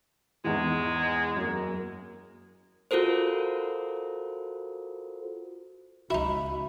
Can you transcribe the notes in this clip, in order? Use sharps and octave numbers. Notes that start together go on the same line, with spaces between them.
E2 G#2 E3 G#3
F#2 A#3
F4 F#4 A4 A#4 C5
C#2 D#4 E4 F#4 B5